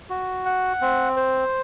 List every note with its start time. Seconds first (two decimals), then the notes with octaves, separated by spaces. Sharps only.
0.10 F#4
0.45 F#5
0.81 C4
1.17 C5